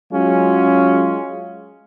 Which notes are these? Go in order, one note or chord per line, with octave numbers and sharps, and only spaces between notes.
F#3 G#3 C#4 F4